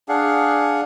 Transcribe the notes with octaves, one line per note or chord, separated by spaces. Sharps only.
D4 G#4 F5 F#5